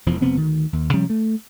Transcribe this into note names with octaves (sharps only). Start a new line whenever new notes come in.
E1 E2 F3
F1 C3 B3 C4
D2 D#3
D#2
C3 F3 G3 C#4
A3